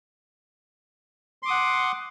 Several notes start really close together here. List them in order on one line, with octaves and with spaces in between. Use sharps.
C6 D6 D#6 F#5